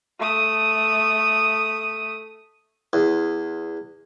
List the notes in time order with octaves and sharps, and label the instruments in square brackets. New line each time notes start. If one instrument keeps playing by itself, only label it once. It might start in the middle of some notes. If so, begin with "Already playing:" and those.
[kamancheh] A3 D#6
[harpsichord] E2